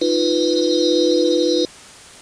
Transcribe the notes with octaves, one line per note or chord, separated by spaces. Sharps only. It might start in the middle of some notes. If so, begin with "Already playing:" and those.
D#4 F4 B4